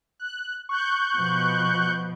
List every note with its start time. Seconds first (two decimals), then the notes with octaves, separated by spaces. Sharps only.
0.20 F#6
0.69 C#6 F#6 G6
1.16 B2 F3